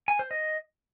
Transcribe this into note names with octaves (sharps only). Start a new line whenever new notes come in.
G#5
C5
D#5